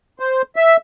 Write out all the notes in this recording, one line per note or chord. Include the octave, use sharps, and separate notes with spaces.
C5
E5